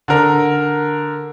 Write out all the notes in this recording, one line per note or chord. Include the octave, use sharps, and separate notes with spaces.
D3 A#4